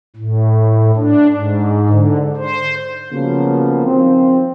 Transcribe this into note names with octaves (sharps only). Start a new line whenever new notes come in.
A2
D4
G#2
D3
C5
C#3 F3 F#3 A#3 B3
D#3 F3 C4